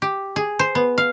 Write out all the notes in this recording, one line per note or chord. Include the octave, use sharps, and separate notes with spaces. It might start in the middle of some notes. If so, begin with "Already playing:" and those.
G4
G#4
C5
B3
F5